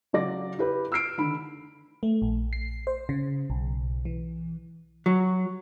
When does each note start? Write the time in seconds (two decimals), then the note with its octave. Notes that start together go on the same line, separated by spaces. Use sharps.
0.13 C#3 F#3 D5 A#6
0.58 E4 G4 B4
0.92 E6 F6 C7 D7
1.18 D3 D#3 B5
2.03 A3
2.22 A#1
2.53 C7
2.87 C5
3.09 C#3
3.50 B1
4.05 E3
5.06 F#3